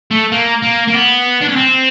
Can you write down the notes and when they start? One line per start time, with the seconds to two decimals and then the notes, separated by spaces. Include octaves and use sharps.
0.11 A3
0.32 A#3
0.63 A#3
0.88 A#3
0.94 B3
1.41 D4
1.49 C#4
1.56 C4